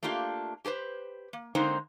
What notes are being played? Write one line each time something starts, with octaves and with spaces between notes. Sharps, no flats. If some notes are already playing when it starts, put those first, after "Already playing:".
A3 A#3 D4 F4 G4
G4 G#4 B4 C5
A#3
D3 G#3 A#3 C4 D#4 C5